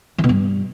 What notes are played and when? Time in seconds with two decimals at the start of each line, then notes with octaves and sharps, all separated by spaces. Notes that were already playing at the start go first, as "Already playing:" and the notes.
0.18 E3
0.24 B2
0.29 G2